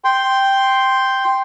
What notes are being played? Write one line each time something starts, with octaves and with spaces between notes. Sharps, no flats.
G5 C6